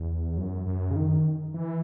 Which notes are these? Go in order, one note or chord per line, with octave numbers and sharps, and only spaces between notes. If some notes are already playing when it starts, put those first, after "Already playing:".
Already playing: E2
F#2
F#2
C#3
D#3
E3